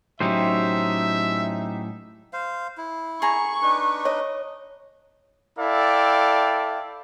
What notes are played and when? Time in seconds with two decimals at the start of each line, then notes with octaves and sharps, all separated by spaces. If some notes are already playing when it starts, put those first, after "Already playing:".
0.20 A2 F#3 C#4 D#4 G4 C5 E5
2.33 C5 F5
2.78 E4
3.22 G#4 A#5 C#6
3.62 D4 D#4 B4
4.05 C#5 D#5
5.59 E4 A4 D5 F5 G5